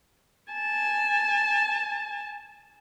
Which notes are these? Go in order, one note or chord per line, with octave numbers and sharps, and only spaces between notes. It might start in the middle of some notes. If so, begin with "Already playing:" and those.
G#5 A5